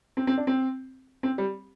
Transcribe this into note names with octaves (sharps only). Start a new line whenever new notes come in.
C4
C4
D4
C4
C4
G3